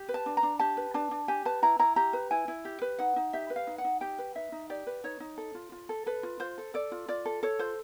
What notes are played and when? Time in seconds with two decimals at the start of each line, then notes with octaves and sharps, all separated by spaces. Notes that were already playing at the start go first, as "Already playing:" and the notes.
Already playing: G4
0.09 B4
0.14 A5
0.26 D4
0.37 A#5
0.43 D4
0.59 G4 A5
0.77 B4
0.94 D4 A5
1.11 D4
1.28 G4 G#5
1.45 B4 A5
1.62 E4 A#5
1.79 E4 A#5
1.96 G4 A#5
2.13 B4
2.31 E4 G#5
2.48 E4
2.65 G4
2.82 B4
2.99 D#4 F#5
3.16 D#4
3.33 G4 E5
3.50 B4
3.56 F5
3.67 D#4
3.78 F#5
3.84 D#4
4.01 G4 G5
4.18 B4
4.35 D#4 E5
4.52 D#4
4.70 G4 D5
4.87 B4
5.04 D#4 C#5
5.20 D#4
5.38 A4
5.55 F4
5.72 F4
5.89 A4
6.06 A4 B4
6.23 F4
6.40 F4 C5
6.58 A4
6.74 A4 D5
6.92 F4
7.08 F4 D5
7.26 A4
7.43 A4 C#5
7.59 F4 C5